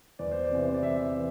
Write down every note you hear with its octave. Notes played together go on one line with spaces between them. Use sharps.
E2 D5
C5
D5
C3 E3
C5
D5
E2 E5
E3